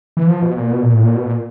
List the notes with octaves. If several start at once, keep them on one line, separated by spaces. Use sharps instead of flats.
E3
F3
B2
A#2
B2
A#2
A2
A#2
B2
A#2